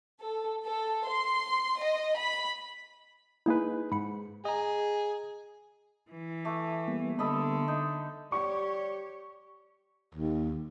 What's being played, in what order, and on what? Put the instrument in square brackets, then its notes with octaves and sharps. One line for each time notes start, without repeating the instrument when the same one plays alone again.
[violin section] A4
A4
C6
D#5
B5
[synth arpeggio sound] A#3 E4 [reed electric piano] D#4 G#4 B4
[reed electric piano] G#2 [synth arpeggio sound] B5 C#7
[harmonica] G#4 [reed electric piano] D#5 A#5
[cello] E3
[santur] A3 D6
[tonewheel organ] G3 A#3 B3
[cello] D3 [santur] A4 D#5 B5
[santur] D#4
[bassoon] G3 [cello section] G4 C#5 [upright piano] C#6
[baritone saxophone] D#2